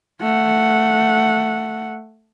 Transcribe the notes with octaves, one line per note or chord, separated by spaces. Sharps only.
A3 F#5